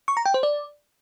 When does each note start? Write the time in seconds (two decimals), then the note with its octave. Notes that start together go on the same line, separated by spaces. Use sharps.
0.08 C#6
0.17 A#5
0.26 G5
0.34 C5
0.43 D5